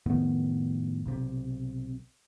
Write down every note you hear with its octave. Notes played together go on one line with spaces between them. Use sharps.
F2 A2 D#3 B3
B1 C3